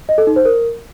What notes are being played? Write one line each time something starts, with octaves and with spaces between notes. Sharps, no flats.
D#5
A4
D#4
C5
A#4